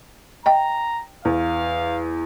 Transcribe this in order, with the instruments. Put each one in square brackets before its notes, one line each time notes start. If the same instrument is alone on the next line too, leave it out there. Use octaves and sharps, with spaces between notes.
[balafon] D#5 G5 [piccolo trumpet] A#5
[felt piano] E2 [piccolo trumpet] F5